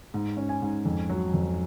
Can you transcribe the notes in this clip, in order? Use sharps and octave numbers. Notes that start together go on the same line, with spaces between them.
G#2
C#4
G#5
G#2
F2
F#3
F2